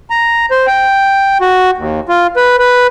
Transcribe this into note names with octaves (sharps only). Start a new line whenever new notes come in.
A#5
C5
G5
F#4
D#2
F4
B4
B4